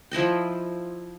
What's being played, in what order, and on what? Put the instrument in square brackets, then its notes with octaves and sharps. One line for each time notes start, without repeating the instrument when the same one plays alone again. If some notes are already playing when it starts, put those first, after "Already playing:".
[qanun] F3 E4 D#5 G5